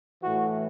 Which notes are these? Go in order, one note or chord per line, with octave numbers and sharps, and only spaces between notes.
A2 E3 F#4